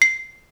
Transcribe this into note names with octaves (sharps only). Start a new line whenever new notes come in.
C7